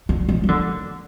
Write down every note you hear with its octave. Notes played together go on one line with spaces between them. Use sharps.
D3
F3
F3
D3